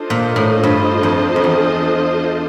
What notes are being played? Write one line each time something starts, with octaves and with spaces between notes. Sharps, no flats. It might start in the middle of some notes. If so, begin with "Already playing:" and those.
Already playing: D4 F4 A4 C5 D#5
A#2
A2
G2
F2
F2
E2